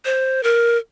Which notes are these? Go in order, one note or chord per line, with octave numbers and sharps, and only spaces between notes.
C5
A#4